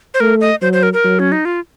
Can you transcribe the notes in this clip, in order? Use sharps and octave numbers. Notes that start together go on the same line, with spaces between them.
C5
A3 A#4
D#5
F#3 C5
C5
A#4
A#4
F#3
C#4
D#4
F4